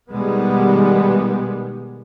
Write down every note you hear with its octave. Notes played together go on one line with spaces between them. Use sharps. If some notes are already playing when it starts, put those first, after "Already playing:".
B2 D#3 G3 G#3 B3